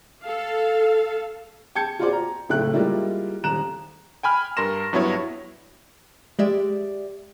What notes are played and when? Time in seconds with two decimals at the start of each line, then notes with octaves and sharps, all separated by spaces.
0.23 A4 F5
1.75 G5 A5 G6 G#6 C#7
1.99 F4 F#4 G#4 C5 D5
2.13 A#5
2.49 F#1 C#2 A2 A3 G5 F#6
2.73 G3 G#3 A#3 E4 F4
3.44 D#1 A#5 F#6 E7
4.23 G5 G#5 B5 F6
4.57 G2 A#4 C6 A#6 E7
4.93 G2 F#3 B3 E4 C#5
6.39 G#3 G4 D5 E5